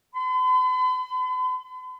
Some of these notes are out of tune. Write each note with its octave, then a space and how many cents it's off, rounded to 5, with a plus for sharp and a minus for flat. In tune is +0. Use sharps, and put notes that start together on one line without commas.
B5 +45